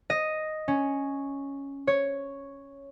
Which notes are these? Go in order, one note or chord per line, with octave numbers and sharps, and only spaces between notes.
D#5
C#4
C#5